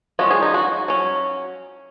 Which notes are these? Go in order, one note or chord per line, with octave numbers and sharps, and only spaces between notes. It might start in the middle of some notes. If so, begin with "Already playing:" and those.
F3 G#3 C#4 F#4
G#4
D#4
F#4
F#3 C#4